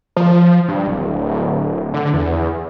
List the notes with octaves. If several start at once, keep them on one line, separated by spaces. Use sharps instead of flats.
F3
G2
D1
D3
E2